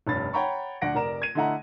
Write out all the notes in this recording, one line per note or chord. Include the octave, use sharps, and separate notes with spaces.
F1 G2 C#4 B5 A6
C#5 F#5 G5 A#5 B5 C#6
D2 D4 F#5 A#6 D7
F1 A#4 D5 A#5 E7
G#6 D#7
D3 A3 E4 D#5 F#5 A#5